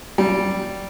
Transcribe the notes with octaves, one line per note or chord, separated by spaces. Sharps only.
G3